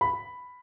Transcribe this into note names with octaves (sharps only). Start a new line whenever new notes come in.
B5